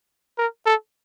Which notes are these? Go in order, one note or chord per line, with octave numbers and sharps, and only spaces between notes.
A#4
A4